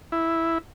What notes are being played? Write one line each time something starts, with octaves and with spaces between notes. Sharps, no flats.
E4